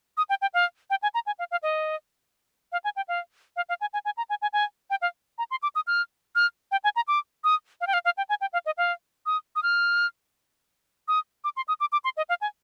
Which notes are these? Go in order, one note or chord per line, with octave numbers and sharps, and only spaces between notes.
D#6
G5
G5
F5
G5
G#5
A#5
G#5
F5
F5
D#5
F5
G#5
G5
F5
F5
F5
G#5
G#5
G#5
A#5
G#5
G#5
G#5
G5
F5
A#5
C6
D6
D#6
F6
F6
G5
G#5
A#5
D6
D#6
F5
G5
F5
F5
G5
G#5
G5
F5
D#5
F5
D#6
D#6
F6
D#6
D6
C6
D#6
D6
D6
C6
D#5
F5
G#5